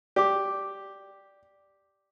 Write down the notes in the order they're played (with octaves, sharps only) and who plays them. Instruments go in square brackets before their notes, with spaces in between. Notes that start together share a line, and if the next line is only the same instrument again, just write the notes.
[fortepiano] G4 [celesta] D5 D6